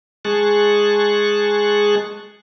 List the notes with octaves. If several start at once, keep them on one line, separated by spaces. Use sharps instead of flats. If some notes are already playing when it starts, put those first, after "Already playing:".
G#3 G#4 A5 C#6 F#6